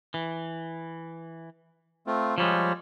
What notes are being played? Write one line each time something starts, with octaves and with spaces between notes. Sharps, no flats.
E3
A3 C4 F4
F3 G3 G#3 C#5